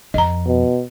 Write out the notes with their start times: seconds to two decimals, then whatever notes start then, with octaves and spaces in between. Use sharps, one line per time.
0.14 F2 D#5 A#5
0.47 B2